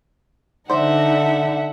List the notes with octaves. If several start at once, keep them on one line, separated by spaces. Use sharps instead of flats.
D3 D#4 C5 D5 E5 F#5